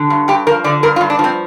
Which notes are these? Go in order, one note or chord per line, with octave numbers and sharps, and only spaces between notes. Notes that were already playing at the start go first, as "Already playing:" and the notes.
Already playing: D3
G2
G2 G4
F3 A#4
D3 D5
G2 A#4
F4
G2
D4
F3
C4